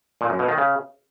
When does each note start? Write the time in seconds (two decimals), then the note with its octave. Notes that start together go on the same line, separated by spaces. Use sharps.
0.21 A#2
0.30 F#2
0.39 B2
0.48 D#3
0.58 C#3